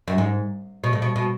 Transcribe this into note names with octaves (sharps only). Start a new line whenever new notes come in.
F#2
G#2
B2
A2
B2
B2